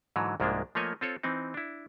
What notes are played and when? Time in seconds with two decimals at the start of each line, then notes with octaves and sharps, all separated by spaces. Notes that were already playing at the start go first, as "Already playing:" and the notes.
0.16 G#2 D3 E3 F#3
0.40 C2 G#2 F3 G#3 A#3 D4
0.75 F3 A3 A#3 C#5 D#5 G#5
1.01 C4 F4 A4 C#5
1.23 E3 C4 D#4
1.54 D4 E4